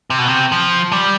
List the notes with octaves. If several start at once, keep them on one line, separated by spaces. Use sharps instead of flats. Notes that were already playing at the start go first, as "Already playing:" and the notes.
C3
B2
C3
F3
G3